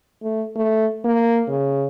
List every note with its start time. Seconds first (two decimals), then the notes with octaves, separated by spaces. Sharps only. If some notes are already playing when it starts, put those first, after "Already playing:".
0.23 A3
0.56 A3
1.04 A#3
1.49 C#3